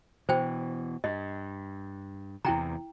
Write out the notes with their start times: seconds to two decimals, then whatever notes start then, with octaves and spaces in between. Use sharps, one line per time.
0.29 B2 E3 C5 G5
1.04 G2 D#5
2.45 E2 C3 E4 G5 A#5